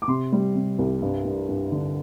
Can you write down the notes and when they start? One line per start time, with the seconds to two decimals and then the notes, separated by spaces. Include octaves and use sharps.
0.02 D6
0.08 C3 C6
0.32 G3
0.55 C3
0.78 C2
1.02 G2
1.25 G2
1.49 G2
1.72 D3